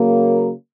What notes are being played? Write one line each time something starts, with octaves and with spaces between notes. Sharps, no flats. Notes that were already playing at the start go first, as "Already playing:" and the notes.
Already playing: C#3 F#3 A#3